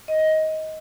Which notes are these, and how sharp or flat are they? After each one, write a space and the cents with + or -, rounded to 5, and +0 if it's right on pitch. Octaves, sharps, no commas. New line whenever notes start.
D#5 +15